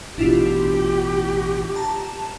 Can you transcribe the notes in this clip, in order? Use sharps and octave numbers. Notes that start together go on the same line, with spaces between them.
A1 B2 D4 E4 F4 G4
A5 A#5